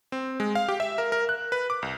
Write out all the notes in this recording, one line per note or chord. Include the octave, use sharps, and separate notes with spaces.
C4
G#3
F5
G4
E5
A#4
A#4
F#6
B4
D6
C2